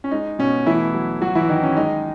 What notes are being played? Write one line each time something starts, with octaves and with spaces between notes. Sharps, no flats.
C#4
G#3 D#4
B2 C#4
E3 A3 E4
F#3
F#3 F#4
E3 E4
D#3 D#4
C#4
G#3 D#4